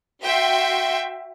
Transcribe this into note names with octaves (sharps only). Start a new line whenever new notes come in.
F#4 E5 G5 C6